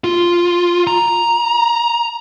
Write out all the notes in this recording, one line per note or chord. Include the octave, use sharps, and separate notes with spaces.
F4
A#5